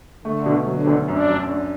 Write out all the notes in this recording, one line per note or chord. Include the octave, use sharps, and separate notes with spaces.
D3 A3
B2
D3 F#3
D2
F#2 D4
F#2
D4